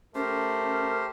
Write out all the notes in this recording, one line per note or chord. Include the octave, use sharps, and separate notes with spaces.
A3 C#4 G4 A#4 C5